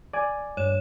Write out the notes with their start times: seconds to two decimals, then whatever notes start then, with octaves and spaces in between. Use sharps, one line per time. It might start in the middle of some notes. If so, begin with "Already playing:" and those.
0.13 D5 G#5
0.57 G2 C#5 E7